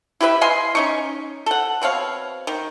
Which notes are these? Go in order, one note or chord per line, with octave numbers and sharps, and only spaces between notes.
E4 G4 B4 E5
D#5 F5 G#5 C6
C#4 D#4 C#6
A4 F#5
B2 C4 C#5 F5
D#3